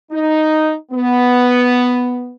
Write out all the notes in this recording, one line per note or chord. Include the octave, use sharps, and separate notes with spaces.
D#4
B3